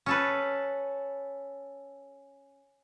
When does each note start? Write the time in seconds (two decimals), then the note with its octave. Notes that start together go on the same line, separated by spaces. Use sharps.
0.06 C#4 A4 B4